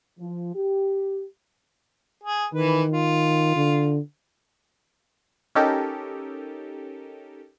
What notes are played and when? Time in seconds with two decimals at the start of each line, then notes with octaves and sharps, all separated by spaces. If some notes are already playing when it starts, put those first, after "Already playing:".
0.19 F3
0.55 G4
2.24 G#4
2.54 D#3 E3 B4
2.92 F4
3.56 D3
5.55 C#4 D#4 G4 A4 A#4